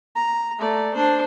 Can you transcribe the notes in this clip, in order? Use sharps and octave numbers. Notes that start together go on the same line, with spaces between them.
A#5
A3 D5
D4 C5